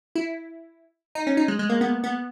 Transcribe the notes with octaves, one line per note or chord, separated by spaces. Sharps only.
E4
D#4
C#4
D#4
G#3
G#3
A#3
B3
B3